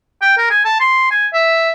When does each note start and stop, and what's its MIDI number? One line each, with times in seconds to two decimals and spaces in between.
0.22 0.34 79
0.38 0.49 70
0.50 0.62 80
0.65 0.76 81
0.80 1.07 84
1.11 1.27 80
1.34 1.72 76